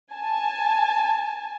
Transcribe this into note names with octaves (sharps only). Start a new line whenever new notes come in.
G#5 A5